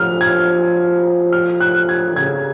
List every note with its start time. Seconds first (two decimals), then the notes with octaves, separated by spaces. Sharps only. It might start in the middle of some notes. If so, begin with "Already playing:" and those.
Already playing: F3 F6
0.21 G#6
1.32 F6
1.60 F#6
1.89 G#6
2.16 C#3 G#6